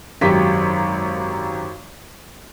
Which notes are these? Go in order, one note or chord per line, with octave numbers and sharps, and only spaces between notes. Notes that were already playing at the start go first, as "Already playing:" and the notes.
G#1 F#2 G4 B6